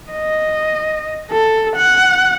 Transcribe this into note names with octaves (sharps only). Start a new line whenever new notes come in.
D#5
A4
F#5